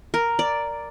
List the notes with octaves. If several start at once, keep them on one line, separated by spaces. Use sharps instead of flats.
A#4
D5